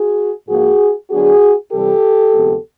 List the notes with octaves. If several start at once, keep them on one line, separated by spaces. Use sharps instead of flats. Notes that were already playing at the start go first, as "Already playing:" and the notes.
Already playing: F#4 G#4
G#2 F3 A#3 F#4 G#4
D3 F#3 B3 D4 F#4 G#4
C3 E3 G3 G4 A4
D2 C3 F3 G#3 B3